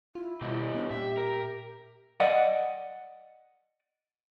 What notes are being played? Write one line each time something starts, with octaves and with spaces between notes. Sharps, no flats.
E4 F4
B2 D#3 G3
B3 D4
A#2 G4 E5
A#4
D5 D#5 F#5